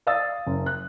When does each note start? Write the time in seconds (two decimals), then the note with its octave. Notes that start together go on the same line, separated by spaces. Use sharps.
0.07 D5 F5 D#6 E6 A6
0.47 F#1
0.66 F#6